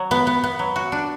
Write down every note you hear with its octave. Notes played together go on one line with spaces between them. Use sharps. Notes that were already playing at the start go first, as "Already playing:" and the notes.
Already playing: F#3
B3
B3
B3
F#3
F#4
D4